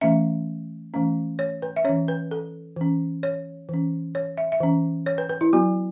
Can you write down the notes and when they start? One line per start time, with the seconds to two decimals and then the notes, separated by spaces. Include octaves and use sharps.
0.01 E3 A3 C#4 E5
0.94 E3 A3 C#4
1.39 C#5
1.62 B4
1.76 E5
1.84 E3 C#4 C#5
2.08 B4
2.31 A4
2.76 E3 C#4
3.23 C#5
3.69 E3 C#4
4.15 C#5
4.38 E5
4.52 E5
4.60 E3 C#4
5.06 C#5
5.18 B4
5.30 B4
5.41 E4
5.53 F#3 B3 F#4